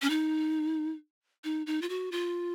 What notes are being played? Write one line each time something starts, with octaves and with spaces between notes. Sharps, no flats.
C#4
D#4
D#4
D#4
F4
F#4
F4